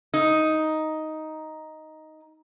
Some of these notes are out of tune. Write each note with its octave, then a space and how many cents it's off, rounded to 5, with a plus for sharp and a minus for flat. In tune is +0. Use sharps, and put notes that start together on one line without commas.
D#4 +5